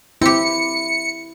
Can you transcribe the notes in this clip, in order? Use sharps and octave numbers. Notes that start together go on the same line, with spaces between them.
C4 E4 G4 C#7